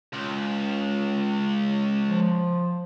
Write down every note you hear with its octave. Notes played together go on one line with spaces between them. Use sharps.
C#2
F3